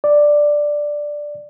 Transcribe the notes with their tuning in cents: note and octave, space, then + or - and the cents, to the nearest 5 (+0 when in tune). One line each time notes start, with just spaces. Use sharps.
D5 +5